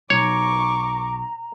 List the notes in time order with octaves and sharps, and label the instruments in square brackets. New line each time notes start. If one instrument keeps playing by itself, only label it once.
[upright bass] B1 [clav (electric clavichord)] C#5 [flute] A#5 [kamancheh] C#6 D6